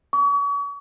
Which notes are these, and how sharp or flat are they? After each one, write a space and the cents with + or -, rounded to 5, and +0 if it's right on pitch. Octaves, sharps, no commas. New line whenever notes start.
C#6 +40